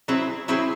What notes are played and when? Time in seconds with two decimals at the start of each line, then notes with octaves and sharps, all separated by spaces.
0.08 F#3 C4 E4 G#4
0.48 F#3 C4 E4 G#4